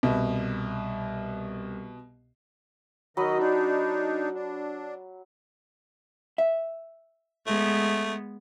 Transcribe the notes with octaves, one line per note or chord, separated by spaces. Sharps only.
C2 B2
D#3 F#3 D#5 B5
D4 D#4
D4
E5
G#3 A3 B3